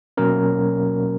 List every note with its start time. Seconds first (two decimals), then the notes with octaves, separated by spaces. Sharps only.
0.17 B2 F#3 A#3 C#4 A#4